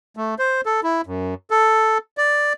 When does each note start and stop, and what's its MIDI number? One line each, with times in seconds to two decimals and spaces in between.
0.16 0.35 57
0.39 0.61 72
0.66 0.80 69
0.83 1.01 64
1.06 1.34 42
1.50 1.98 69
2.17 2.53 74